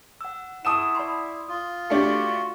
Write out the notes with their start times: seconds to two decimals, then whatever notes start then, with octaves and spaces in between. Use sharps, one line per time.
0.21 F#5 E6
0.65 E4 F#5 A5 C#6 D#6 E6 E7
0.95 D5 B5 C6
1.49 F4 D#6
1.90 A3 D4 F#4 G4 F5